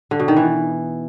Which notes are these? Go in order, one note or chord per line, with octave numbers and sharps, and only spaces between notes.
D3
B2
D#3
E3